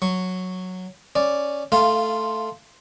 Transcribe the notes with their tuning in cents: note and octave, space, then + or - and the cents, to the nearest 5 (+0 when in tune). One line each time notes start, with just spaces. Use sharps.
F#3 -5 C#6 +0
C#4 +0 D5 +0
A3 +0 F4 +0 F5 -20